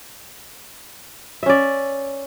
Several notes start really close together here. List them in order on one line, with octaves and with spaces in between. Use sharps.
E5 C#4 D5